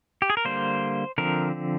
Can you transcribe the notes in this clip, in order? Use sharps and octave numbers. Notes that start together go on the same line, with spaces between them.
G4
G#4
A#4
D3 G3 A#3 C5
D3 F3 C4 A#4